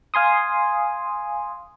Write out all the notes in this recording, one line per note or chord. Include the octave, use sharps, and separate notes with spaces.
F5 G#5 C6 D#6